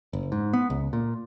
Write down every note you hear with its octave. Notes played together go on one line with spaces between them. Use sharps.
F#1
G#2
B3
C#2
A#2